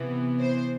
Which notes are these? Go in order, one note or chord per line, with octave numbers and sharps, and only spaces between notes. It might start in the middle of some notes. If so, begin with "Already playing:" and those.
Already playing: C3 E3 B3
C5